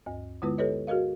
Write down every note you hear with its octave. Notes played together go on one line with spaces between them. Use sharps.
D2 G2
D3 G#3 B3 E4 F4 B4
G4 A4 B4 C#5 D#5
F#4 G#4 A#4 D#5 F5